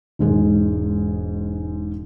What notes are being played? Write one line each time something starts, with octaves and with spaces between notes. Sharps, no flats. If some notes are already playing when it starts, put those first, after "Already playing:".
E1 G#2 G#3